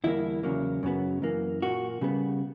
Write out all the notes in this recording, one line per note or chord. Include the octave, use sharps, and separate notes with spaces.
E2 D3 G3 A#3 E4
E2 C#3 F#3 A#3
F#2 C#3 F#3 B3
F#2 E3 A#3
A#2 A#3 F#4
C#3 G3 B3